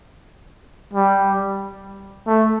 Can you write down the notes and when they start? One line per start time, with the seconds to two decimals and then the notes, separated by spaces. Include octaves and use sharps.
0.93 G3
2.27 A3